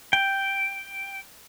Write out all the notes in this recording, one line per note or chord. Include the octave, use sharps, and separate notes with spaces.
G5